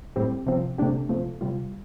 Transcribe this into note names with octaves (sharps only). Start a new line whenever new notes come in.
A2 G3 C4 G4
C3 F3 C4
C3 A3 D4 G4
C3 F3 A3
C3 G3 F4